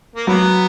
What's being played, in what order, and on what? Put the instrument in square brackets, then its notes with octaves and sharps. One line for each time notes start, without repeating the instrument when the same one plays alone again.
[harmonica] A#3
[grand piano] F#3 [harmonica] B3